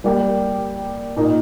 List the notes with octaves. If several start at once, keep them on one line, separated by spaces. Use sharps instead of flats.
G3 A#3 G4 A#4
A#2 A#3 D#4